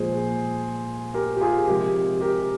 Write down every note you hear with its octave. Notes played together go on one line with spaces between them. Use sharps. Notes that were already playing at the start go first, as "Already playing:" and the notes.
Already playing: A#2 F3 G#3 G#4 C5
G4 A#4
G4
F4 G#4
C3 F3 G#3 G4 A#4
G4 A#4